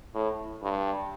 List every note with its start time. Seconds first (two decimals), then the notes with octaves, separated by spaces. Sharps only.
0.14 A2
0.63 G2